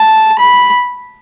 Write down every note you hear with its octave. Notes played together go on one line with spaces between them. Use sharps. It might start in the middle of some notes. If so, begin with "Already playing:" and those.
Already playing: A5
B5